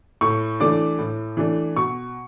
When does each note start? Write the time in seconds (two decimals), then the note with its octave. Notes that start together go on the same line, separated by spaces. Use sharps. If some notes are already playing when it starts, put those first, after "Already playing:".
0.21 A2 C#6
0.60 E3 A3 D4 D6
0.99 A2
1.37 E3 A3 D4
1.76 B2 C#6